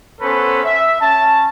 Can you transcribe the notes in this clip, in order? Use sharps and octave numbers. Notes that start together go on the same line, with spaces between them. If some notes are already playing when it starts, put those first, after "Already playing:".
B3 C#4 A4 B4 C5
E5
C#4 A5